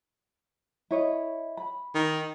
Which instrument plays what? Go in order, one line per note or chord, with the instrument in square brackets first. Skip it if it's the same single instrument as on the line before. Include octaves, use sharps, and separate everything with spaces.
[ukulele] E4 C#5 D#5
B5
[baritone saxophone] D#3